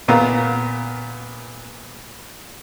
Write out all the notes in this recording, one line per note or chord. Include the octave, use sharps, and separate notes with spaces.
A#2 B3 F5 A#5